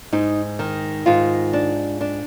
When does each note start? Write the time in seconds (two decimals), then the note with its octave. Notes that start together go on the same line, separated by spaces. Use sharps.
0.12 G#2 D#4
0.59 D#3
1.06 G#2 F4
1.53 D4
2.01 D4